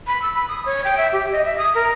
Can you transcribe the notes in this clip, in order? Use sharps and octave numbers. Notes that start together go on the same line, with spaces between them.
B5
E6
B5
D#6
C#5
G5
E5
G4
D#5
E5
D#6
A#4